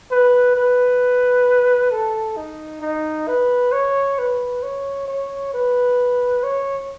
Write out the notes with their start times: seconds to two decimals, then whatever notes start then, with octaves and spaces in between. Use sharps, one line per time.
0.11 B4
0.56 B4
1.91 A4
2.37 D#4
2.82 D#4
3.28 B4
3.72 C#5
4.18 B4
4.63 C#5
5.08 C#5
5.54 B4
6.44 C#5